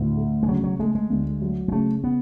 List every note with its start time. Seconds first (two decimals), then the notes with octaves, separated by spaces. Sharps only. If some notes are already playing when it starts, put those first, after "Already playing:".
Already playing: D2 A2
0.17 A3
0.43 G#3
0.48 C#3 F#3
0.64 F#3
0.79 G#3 A3
0.95 G#3
1.10 D2
1.42 F#3
1.68 G#3
1.72 C#3 A3
2.04 B3